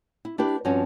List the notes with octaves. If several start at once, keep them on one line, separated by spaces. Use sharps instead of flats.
E4
D4 E4 G4 B4
G2 F3 C4 C#4 F#4